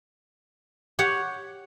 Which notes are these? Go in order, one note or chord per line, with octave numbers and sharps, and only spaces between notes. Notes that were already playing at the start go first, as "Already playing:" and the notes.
G4 C#5 F#5